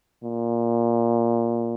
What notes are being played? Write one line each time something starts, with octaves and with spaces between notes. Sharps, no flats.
A#2